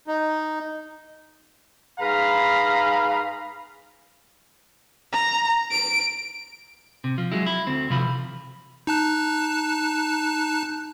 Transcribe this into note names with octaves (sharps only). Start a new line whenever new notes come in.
D#4
G#2 G#4 B4 F5 A#5 B5
A#5
D7
C3
F3
F#3 G#3 E4
E4
D2 C4
C3 E3 F3 B5
D#4 A5 F#6